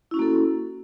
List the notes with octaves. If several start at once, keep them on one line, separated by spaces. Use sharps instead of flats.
A#3 C#4 E4 F#4 A4